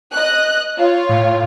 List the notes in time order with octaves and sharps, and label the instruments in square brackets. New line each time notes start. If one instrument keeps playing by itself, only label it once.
[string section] D#5 F#6
F4 C#5
[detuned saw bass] A2